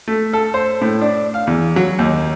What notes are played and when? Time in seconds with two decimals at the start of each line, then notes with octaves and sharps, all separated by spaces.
0.08 A3
0.33 A4
0.54 C5
0.81 A2
1.01 D4
1.34 F5
1.47 E2
1.76 F#3
1.99 D#2